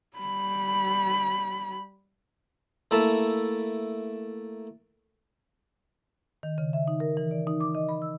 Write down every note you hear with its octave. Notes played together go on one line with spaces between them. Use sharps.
G3 B5
A3 A#3 E4 E5 A5
D#3
C#3
E5
D#4
A#4
E3
D5
D#4
D6
D#5
B5
E6